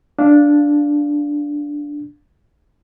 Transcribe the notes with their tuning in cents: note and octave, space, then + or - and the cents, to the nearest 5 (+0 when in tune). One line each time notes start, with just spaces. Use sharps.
D4 -5 F5 +0